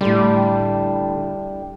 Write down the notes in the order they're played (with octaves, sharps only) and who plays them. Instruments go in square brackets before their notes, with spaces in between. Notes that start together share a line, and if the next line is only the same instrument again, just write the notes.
[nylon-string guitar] A2 D3 [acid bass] G3